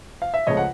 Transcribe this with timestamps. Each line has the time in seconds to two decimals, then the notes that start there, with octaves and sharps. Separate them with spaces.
0.22 F5
0.34 E5
0.47 C#2 C#3 F3 A3 C#5 D#5
0.57 F#5